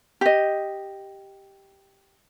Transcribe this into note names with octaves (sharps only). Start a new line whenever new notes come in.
G4 D#5